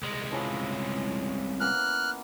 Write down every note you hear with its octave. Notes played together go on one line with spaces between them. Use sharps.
C2 G#3
E3 F3 C#4
E3 A#3 B3 F6 F#6